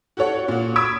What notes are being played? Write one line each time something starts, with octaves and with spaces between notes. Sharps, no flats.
F#4 G4 A4 C#5 F#5
A#2 F#4
C#6 D#6 E6 G#6 B6 D7